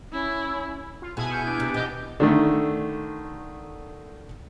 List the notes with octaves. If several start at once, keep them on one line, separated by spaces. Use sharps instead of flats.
C#4 E4
F4
B2 E4 G#4 G#5
C#6 F6 G6
B3 D4
C3
B2 E3 G4 D#5 D6 G6
D3 D#3 A3